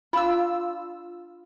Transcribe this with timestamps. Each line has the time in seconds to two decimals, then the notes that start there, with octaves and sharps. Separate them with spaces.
0.13 D4 F4 B5 E6